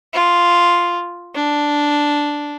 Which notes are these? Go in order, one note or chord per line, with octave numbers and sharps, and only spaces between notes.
F4
D4